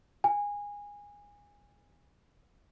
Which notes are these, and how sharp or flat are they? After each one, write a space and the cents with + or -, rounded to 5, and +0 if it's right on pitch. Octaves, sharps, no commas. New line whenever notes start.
G#5 -20